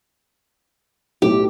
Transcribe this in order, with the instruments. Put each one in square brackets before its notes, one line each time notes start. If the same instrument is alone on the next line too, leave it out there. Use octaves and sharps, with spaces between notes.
[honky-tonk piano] B1 A2 [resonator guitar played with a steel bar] G4